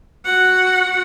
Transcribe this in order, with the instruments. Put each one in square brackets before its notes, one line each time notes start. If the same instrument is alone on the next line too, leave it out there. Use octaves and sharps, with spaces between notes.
[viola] F#4 F#5